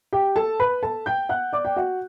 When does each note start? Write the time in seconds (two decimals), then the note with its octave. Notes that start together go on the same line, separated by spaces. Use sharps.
0.13 G4 G5
0.36 A4 A5
0.60 B4 B5
0.82 A4 A5
1.06 G5 G6
1.29 F#5 F#6
1.53 D5 D6
1.65 G5
1.76 F#4 F#5